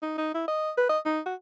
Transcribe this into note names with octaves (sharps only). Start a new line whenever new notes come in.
D#4
D#4
E4
D#5
B4
D#5
D#4
F#4